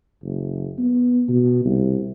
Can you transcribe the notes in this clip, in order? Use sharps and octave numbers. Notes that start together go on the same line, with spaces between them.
F#1
B3
B2
C2